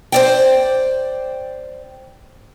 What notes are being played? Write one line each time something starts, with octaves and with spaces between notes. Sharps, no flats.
C5 D5 G5